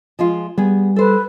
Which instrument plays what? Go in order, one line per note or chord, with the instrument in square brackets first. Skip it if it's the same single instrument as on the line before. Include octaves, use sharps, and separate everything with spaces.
[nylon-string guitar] F3 G#3 F4
[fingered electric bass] G3 [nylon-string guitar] B3 G#4
[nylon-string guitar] A4 C5 [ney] B4